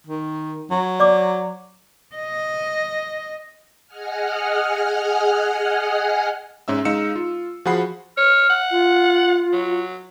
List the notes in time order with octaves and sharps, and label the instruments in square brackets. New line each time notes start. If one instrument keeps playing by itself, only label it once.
[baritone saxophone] D#3
F#3
[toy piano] D5 D6
[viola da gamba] D#5
[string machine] G#4 D#5 F#5 G#5 F6
[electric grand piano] G#2 C#4 E5 E6
G#3 D#4 F5 E6 C#7 E7
F4
F3 F#4 G#4 F#5 B5 C7
[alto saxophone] C#5 [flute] F6
[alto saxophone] F#5
[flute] F4
[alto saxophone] F#3